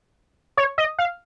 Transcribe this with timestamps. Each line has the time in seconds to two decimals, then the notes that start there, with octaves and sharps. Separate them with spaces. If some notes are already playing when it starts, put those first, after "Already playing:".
0.57 C#5
0.78 D#5
0.99 F5